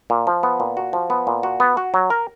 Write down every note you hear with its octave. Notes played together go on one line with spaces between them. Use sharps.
A#2
F3
B3
A#2
F#4
F3
B3
A#2
F#4
B3
F#4
F#3
A#4